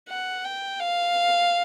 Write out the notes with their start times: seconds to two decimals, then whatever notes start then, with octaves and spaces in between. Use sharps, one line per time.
0.09 F#5
0.45 G5
0.81 F5